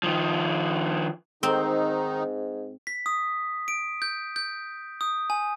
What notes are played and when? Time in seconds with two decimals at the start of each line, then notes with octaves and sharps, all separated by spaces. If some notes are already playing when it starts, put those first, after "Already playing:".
0.03 D#3 F3
1.43 G#2 D#3 C4 D#4
2.87 B6
3.06 D#6
3.68 D7
4.02 G6
4.36 G6
5.01 D#6
5.30 G#5